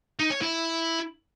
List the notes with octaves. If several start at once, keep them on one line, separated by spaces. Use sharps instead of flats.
D#4
C#5
E4